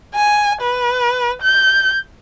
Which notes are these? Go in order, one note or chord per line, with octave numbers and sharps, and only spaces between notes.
G#5
B4
G6